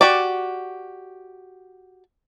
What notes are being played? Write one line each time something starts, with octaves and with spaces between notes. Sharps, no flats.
F#4 G4 D5